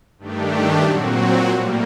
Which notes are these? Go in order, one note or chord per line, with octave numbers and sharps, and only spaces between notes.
G2 D#3 A3 D4 G4
A#2 F#3 C4 F#4
A2 G3 A#3